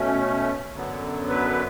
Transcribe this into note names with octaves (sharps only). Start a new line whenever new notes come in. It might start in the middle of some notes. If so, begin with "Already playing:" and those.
Already playing: B2 A3 C#4
F#2 D3 F#3 B3
B4